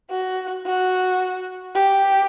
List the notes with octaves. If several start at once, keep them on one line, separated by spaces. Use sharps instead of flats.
F#4
F#4
G4